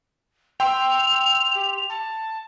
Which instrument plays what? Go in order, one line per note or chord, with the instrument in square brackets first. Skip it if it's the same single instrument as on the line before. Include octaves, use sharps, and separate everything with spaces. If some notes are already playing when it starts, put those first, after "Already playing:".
[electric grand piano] G5 C6 [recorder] E6 [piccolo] F7
[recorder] G4
A5